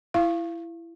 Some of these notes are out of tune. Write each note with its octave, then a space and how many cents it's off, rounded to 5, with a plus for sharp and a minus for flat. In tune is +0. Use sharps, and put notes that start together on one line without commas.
E4 +20 F5 -20 C#6 -25